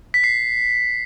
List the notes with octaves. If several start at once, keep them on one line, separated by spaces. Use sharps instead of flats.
B6
C7